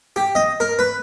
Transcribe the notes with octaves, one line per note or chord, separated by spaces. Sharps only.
G4
D#5
A#4
B4